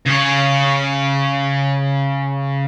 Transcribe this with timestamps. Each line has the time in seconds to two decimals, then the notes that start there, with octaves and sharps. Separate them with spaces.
0.06 C#3 C#5